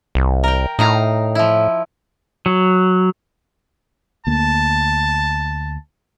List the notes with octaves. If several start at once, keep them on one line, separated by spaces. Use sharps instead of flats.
C2
A#4 G5
A2 D#4 F5 A#5
F3 E4
F#3
D2 A#3 A5